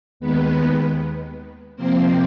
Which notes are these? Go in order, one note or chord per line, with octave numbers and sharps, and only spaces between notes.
D#2 D#3 G#3 B3 B4
C3 F3 A#3 C4 C5